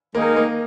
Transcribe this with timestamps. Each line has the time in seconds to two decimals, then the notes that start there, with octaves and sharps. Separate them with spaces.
0.14 D#3 G#3 A#3 D#4 A#4
0.36 A#3